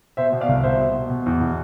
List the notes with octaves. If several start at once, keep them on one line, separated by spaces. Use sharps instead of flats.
B2 C5 E5
B2
D5 F5
C2
B2 C5 E5
B2
B2
B2
E2
B2